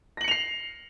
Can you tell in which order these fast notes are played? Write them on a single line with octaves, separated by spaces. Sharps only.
A#6 F#7 C#7 F7 C7